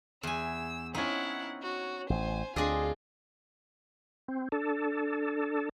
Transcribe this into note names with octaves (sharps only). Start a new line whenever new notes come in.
E2 G#5 E6
C4 C#4 D#4 E4 F#5
F#4 C#5
A1 C5 G#5
D2 C4 D4 F4 G#4 D#5
C4
D4 A4